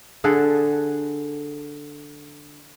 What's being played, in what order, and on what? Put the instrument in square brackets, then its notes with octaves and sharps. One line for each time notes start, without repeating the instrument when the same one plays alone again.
[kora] D3 G#4 A4 F#5